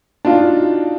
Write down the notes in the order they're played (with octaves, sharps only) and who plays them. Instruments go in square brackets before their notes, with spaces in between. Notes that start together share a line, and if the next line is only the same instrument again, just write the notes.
[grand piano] D4 D#4 F4 F#4